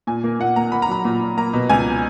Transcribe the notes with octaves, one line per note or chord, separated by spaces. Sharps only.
A#2 G#5
A#3
A#2 F#5
A#3 A#5
A#3 B5
A#5
F#3 B5
A#2
A#2
A#3 A#5
B2
C#2 G#5